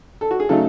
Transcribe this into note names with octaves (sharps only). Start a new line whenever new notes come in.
A4
F#4
G#4
C#3 F#3 A3 D#4 A4